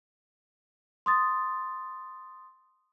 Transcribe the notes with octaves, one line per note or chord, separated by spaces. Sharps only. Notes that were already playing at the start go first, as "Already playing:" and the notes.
C6 D#6 A6